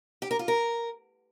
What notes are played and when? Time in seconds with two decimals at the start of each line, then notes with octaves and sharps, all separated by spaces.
0.22 G4
0.31 A#4
0.39 F4
0.48 A#4